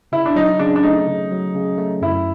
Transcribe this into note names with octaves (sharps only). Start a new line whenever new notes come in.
C#3 E4
D4
F#3 D#4
C#3 D4
D4
A3 D#4
C#3
F#3
C#3
A3
F#2 E4